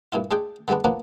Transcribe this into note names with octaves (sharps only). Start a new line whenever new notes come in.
G2 A#2 E4 F4
G#3 D4 G#4 D5 G5
D3 G3 G#3 B3 D4
F3 A#3 B3 C#4 D4